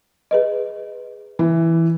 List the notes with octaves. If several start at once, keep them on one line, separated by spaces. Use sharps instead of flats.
G#4 B4 D#5
E3